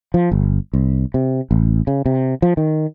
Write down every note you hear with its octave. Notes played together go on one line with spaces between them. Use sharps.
F3
G1
C2
C3
A1
C#3
C3
F3
D#3